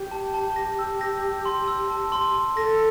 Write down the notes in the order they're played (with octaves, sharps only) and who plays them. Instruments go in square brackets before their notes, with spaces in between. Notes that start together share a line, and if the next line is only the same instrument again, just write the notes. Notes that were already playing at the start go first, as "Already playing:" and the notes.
Already playing: [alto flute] G4
[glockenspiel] A5
A5
A#6
E6
A#6
A#6
C6
E6
A5
C6
C6
[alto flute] A4 [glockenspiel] A#6